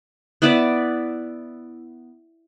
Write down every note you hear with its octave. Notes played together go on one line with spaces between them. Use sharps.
B3 E4 B4 D5